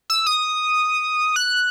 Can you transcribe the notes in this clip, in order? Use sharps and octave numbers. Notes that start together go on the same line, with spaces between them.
E6
D#6
F#6